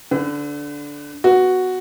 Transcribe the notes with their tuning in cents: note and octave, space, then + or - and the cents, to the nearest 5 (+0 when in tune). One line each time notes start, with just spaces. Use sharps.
D3 -10 B4 +40
B3 +0 F#4 +0